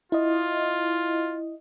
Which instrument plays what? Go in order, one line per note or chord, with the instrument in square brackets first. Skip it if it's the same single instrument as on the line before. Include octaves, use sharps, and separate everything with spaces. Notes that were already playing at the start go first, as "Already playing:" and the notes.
[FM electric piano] E4 D#5 [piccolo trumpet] F4